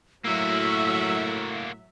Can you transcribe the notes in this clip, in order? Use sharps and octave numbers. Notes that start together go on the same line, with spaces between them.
A2 F#3 A#3 F#4 E5 E6